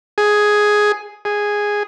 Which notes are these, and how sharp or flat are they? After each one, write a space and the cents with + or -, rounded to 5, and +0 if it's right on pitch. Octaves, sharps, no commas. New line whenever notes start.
G#4 +5
G#4 -5